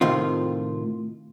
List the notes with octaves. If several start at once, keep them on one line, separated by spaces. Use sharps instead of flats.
A2 C3 D#3 F4